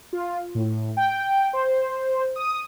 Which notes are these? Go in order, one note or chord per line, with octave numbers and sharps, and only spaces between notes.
F4
A2
G5
C5
D#6